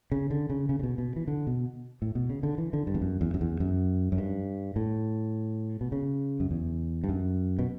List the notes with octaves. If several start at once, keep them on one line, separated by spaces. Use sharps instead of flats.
C#3
D3
C#3
C#3
C#3
B2
B2
E3
D3
B2
A2
B2
C#3
D3
E3
D3
G2
E2
F#2
E2
F#2
E2
F#2
F#2
G2
A2
B2
C#3
F#2
E2
G2
F#2
B2